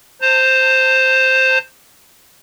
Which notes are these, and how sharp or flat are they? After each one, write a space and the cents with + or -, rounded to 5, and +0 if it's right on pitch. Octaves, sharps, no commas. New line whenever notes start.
C5 +0 A#5 -45